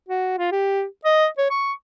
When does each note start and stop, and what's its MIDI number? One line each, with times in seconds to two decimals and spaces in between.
0.09 0.37 66
0.38 0.51 65
0.51 0.84 67
1.05 1.27 75
1.38 1.46 73
1.50 1.73 85